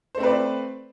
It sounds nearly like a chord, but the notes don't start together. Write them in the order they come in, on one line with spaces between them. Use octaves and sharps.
C5 A3 C4 B4 D5